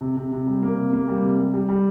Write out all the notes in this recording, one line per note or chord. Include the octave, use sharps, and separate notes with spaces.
C3
C3
C3
G3
A#3
C3
A#3
G3
C3
G3
G3
G3